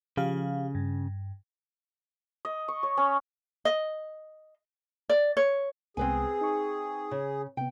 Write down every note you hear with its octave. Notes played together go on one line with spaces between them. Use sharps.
C#3 F3 G4 F5
G2
D#5
C#6
C#5
C#4
D#5
D5
C#5
C2 G#3 B3 C4 G#4 B4 G#5
D#4 C#6
C#3
C3 B3 G5